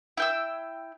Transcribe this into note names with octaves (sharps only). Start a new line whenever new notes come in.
E4 G5 E6